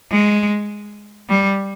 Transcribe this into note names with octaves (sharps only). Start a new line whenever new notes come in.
G#3
G3